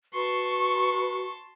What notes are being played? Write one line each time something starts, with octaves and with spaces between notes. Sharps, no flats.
F#4 B4 A5 C6 C#6